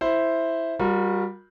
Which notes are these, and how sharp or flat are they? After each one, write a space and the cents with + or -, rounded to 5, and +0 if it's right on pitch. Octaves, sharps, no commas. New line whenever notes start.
E4 +0 C5 +0
G3 +0 F#4 -45 A#4 +0